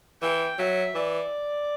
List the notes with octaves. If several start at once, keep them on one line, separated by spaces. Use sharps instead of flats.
E3 G5
F#3 E5
E3 D5